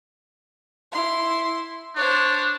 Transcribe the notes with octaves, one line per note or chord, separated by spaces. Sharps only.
E4 C6
D4 C5 C#5